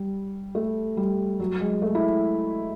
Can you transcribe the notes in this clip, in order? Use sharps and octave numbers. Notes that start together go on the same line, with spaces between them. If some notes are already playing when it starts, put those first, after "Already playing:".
Already playing: G3
A3
G3
F#3
G#3
A3
E4